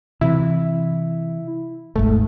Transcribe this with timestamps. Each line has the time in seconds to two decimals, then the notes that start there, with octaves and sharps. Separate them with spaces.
0.21 C3 E3 E4
1.96 D#1 G#1 G#2 A3